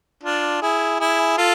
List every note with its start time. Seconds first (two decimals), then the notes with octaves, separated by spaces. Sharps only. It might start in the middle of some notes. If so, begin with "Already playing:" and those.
0.23 D4 F4
0.62 E4 G#4
1.00 E4 G#4
1.38 F4 A4